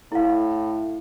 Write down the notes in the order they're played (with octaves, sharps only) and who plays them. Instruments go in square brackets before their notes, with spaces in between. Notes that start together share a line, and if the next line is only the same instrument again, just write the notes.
[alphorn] A2 [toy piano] E4 F5